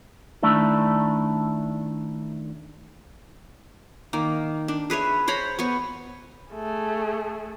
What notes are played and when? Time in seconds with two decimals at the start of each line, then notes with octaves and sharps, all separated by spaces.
0.42 D#3 A3 D4 E4 A4
4.13 D#3 A#3
4.68 D4
4.90 G#4 B4 C#5 E5
5.28 C5 C#5 A#5 B5
5.59 B3 C#5 C#6
6.54 A3 G#4